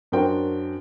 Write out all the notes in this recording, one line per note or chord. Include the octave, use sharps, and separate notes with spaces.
F#2 D4 F#4 A#4 C5 G5